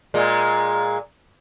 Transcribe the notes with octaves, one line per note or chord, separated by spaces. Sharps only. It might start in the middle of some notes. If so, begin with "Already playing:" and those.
A#2 G#3